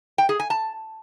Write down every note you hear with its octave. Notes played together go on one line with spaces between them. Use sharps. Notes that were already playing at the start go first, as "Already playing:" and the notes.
G5
G#4
G#5
A5